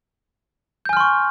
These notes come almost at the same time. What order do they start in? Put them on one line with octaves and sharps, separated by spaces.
G6 G#5 F6 C6 C#6